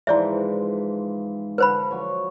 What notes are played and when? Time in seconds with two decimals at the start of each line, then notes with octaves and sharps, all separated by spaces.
0.07 G#2 E3 F3 E4 D5 E5
1.58 D3 B4 C5 B5
1.91 F3 F#3 C#5